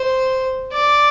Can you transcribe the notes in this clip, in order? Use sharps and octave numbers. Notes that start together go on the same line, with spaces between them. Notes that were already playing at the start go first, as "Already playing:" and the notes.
Already playing: C5
D5